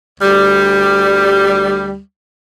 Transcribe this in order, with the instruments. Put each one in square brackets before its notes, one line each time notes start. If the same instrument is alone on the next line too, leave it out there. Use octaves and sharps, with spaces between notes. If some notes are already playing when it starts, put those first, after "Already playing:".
[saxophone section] D2 G3